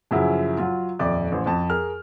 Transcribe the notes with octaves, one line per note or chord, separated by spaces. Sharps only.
F#2 C#3 F3 F#3 E4
F#3 F4
D#1 F2 D5 E5 D6
A1 C5
F2 A5
G#4 A#4 F6